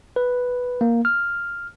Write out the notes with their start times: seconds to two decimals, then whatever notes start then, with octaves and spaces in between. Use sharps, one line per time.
0.16 B4
0.81 A#3
1.05 F6